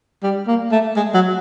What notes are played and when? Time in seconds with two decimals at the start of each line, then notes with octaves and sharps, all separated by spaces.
0.23 G3
0.47 A#3
0.71 A3
0.96 G#3
1.14 F#3